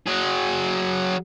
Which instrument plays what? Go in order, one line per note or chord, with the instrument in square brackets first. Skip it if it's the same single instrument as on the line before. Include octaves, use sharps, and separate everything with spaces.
[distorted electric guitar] F#3 G#4